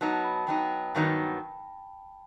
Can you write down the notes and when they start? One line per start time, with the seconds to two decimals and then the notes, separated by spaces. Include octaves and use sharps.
0.01 F#3 B3 D#4 A5
0.12 A5
0.24 B5
0.36 A5
0.47 F#3 B3 D#4 G5
0.95 G2 D#3 F#3 B3 D#4